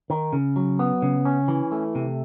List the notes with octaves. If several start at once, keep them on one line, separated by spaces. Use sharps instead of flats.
D#3
C#3
F#3
B3
C#3
C#4
E3
A3
C3